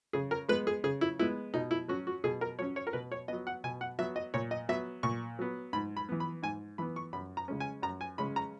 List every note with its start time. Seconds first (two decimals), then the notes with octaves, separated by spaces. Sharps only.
0.13 C#3 G#4
0.31 A#4
0.49 G#3 B3 B4
0.67 G#4
0.84 C#3 G#4
1.01 E4
1.19 G#3 B3 E4
1.54 B2 D#4
1.71 E4
1.88 F#3 C#4 F#4
2.07 F#4
2.24 B2 G#4
2.41 A#4
2.59 F#3 C#4 C#5
2.76 C#5
2.87 A#4
2.93 B2 B4
3.12 C#5
3.28 F#3 B3 D#5
3.47 F#5
3.64 B2 G#5
3.81 F#5
3.99 F#3 B3 E5
4.16 D#5
4.34 A#2 C#5
4.51 D#5
4.69 F#3 B3 E5
5.03 A#2 C#6
5.39 F#3 B3
5.73 G#2 B5
5.97 B5
6.09 E3 B3
6.20 B5
6.43 G#2 G#5
6.78 E3 B3 B5
6.96 C#6
7.13 F#2 B5
7.37 A#5
7.48 C#3 G#3 C#4
7.60 G#5
7.83 F#2 A#5
8.01 G#5
8.18 C#3 G#3 C#4 B5
8.36 A#5